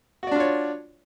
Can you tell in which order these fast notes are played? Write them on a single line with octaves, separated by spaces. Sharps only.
F#4 D5 D4 F4 C#5